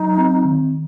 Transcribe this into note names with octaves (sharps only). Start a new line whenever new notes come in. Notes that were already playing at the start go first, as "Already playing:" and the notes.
Already playing: F#3 D#4
C4
D#3